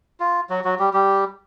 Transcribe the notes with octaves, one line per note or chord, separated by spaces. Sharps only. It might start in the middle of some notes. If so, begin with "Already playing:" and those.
F4
F#3 F#4
F#3 F#4
G3 G4
G3 G4